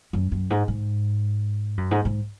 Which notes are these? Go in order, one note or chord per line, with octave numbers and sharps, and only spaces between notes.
F#2
F#2
G#2
G#2
F#2
G#2
G#2